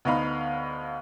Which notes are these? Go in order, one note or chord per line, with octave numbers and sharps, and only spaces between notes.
D2 B3 D#4 F5 B5